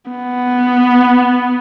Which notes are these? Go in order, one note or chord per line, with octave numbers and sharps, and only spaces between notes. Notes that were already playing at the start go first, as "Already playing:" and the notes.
B3